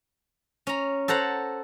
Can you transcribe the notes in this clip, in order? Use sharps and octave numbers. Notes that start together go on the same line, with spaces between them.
C#4 A#5
A4 C5 F#5 A#5